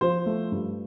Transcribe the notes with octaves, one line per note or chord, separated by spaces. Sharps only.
F3 C5
A3
G2